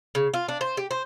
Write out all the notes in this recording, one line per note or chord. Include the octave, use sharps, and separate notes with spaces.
C#3
F4
D4
C5
G4
C5